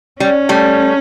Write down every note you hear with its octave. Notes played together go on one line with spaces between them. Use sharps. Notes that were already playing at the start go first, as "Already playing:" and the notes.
G3 C#4
G3 A3